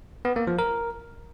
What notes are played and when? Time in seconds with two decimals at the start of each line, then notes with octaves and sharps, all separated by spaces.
0.25 B3
0.36 A#3
0.47 F3
0.59 A#4